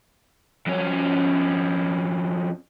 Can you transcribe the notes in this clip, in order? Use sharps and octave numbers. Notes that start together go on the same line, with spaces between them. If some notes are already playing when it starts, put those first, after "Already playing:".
F2 C#4